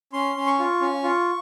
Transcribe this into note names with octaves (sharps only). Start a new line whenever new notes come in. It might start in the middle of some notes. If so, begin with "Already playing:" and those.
C#4 C6
C#4
C#6
F4
C#4
F4